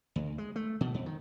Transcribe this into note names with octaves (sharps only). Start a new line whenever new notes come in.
D2
G#3
A3
B2
F2
D#3